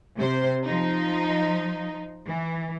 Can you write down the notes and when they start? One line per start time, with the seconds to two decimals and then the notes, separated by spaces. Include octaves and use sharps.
0.17 C3 C5
0.64 F3 D#4
2.27 E3